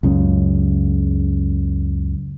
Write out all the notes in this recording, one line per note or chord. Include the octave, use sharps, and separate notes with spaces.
C#2 F#2 C#3